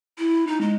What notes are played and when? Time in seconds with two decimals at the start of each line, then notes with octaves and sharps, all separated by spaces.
0.18 E4
0.47 D#4
0.61 G#3